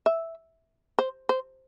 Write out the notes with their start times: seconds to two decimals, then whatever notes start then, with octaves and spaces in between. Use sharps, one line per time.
0.06 E5
0.99 C5
1.29 C5